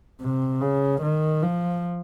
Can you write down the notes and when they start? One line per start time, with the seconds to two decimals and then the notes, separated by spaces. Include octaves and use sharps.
0.22 C3
0.61 C#3
1.02 D#3
1.43 F3